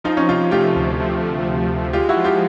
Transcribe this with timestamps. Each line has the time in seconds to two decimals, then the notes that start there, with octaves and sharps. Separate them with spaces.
0.04 F3 D#4 F4
0.17 C#4 D#4
0.29 C3 D#4 F4
0.51 A3 F4 G4
0.76 D2
1.00 F3
1.22 C3
1.46 A3
1.70 D2
1.93 G#3 F4 G4
2.09 E4 F#4
2.16 F3
2.24 F4 G4